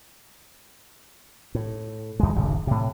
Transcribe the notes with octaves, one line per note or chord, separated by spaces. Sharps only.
A2
D#2 G#3
D1 G#1 F#2 C#3
A2 C3